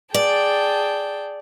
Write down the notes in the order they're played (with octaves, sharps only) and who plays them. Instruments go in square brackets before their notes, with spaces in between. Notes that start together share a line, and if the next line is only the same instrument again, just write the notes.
[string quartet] G#4 G5 A5 [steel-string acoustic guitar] D5